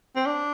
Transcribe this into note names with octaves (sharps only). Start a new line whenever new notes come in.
C4
D4